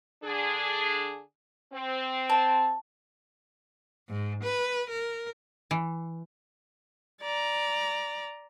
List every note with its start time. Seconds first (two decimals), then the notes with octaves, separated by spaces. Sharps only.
0.24 D3 D4 G#4
1.73 C4
2.30 A5
4.08 G#2
4.43 B4
4.90 A#4
5.71 E3
7.22 D5 A#5